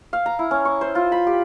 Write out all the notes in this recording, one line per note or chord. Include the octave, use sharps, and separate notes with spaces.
F5
A#5
E4
C#4
C#6
C5
F4
B5
G4